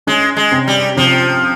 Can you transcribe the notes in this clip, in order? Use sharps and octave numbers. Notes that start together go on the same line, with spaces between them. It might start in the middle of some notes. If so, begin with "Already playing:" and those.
G#3 C#4
G#3
C3
G3
C3 F3